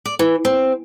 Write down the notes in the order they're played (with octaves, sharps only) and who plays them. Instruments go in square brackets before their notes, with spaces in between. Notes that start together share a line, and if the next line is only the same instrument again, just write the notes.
[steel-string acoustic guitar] D5
E3
C4